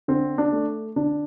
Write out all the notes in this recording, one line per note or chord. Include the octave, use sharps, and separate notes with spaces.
D3 C4
D4
A3
D3 D4